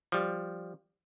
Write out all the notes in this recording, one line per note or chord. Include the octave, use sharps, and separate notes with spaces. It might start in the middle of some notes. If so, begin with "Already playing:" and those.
F3 G3